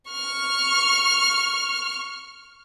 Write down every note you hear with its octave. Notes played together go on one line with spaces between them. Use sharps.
C#6 F6